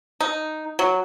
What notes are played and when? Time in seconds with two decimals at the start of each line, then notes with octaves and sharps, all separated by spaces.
0.21 D#4
0.79 F#3